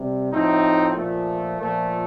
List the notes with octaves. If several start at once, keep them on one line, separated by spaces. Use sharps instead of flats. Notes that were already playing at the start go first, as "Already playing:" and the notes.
Already playing: C3 G3
A2 F3 A3 C4 D#4
A#2 F3 A3
A#2 F3 A3